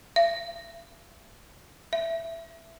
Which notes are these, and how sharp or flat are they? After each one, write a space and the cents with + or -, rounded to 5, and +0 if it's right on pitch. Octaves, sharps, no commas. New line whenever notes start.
E5 +40
E5 +10